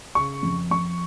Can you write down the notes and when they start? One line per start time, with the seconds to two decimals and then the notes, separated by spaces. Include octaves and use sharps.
0.15 C#3 C#6
0.43 F2
0.71 F2 C#6